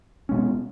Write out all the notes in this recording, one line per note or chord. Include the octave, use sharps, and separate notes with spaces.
B2 G#3 C#4